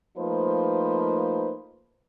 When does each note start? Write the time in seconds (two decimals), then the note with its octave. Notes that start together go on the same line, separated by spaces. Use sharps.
0.18 F3 A3 A#3 D#4 B4 C5